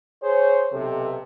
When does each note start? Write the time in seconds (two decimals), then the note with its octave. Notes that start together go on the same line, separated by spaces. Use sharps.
0.23 G#4 C5 C#5
0.72 B1 C3 A4